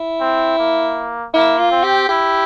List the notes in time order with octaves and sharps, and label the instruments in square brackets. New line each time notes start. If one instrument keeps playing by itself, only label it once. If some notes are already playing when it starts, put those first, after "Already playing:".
Already playing: [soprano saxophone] E4
[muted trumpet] C4
A#3
[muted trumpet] A#3 [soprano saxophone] E4
[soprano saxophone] F4
[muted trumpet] C4
[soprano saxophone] G4
[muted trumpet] E4 [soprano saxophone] G4